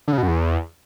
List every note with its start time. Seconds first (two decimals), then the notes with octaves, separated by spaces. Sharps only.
0.08 D3
0.13 C#3
0.18 B2
0.23 F#2
0.28 E2